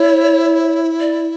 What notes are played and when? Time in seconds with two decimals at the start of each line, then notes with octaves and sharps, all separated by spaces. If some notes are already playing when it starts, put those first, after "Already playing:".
Already playing: E4 C#5
1.00 D5